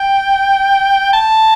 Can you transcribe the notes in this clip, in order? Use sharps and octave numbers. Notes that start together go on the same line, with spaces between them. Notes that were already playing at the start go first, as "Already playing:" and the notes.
Already playing: G5
A5